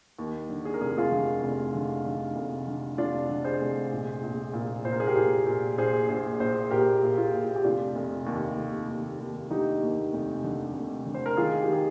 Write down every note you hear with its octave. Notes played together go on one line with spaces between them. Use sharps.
D#2
D3
G#4
A#4
F1 G#4
A#4
F4 G#4
D3
F1
D3
D3
F1
D3
F1 D4 F4
D3
G#4 C5
F1
A#1
A#1
A#2
A#2 C5
A#4
G#4
G4 A#4
A#2
A#2
A#1 G#4 C5
A#1 G#4 C5
A#1 G#4 C5
A#2 G4 A#4
A#2
F4 G#4
A#2
G4
F1 D4 F4
F1
D#2
F1
D#2
D#2
D3 D#4 G4
D#2
F1
D3
F1
D3
C5
A#4
D#3 F4 G#4
G4
D#3 G#4